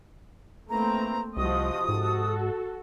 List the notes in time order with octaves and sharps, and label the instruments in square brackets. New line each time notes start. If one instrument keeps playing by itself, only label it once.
[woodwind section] E3 E4 A#5 [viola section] A3 A#3 C4
[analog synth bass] C2 [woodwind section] C3 D#6 [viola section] F3 F#4 D#5
[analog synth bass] G#2 [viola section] F#4 A4